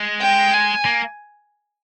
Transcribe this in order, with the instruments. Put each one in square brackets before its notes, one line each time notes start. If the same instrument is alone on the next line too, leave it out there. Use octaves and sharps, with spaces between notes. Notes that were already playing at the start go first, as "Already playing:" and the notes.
Already playing: [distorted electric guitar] G#3
[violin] G5
G#5
[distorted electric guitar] A#3